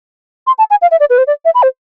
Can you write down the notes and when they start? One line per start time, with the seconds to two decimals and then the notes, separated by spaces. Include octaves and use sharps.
0.47 C6
0.59 A5
0.70 G#5
0.82 F5
0.91 E5
1.00 D5
1.10 B4
1.18 C5
1.27 D5
1.45 E5
1.55 B5
1.63 C5